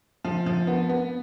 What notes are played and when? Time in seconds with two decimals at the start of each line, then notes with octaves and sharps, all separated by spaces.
0.25 F3
0.46 F3
0.67 B3
0.89 B3